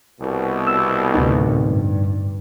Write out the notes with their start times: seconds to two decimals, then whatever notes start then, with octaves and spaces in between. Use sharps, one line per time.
0.20 C2 B2
0.67 E6
1.15 D2 A2 C3 D#4
1.67 G2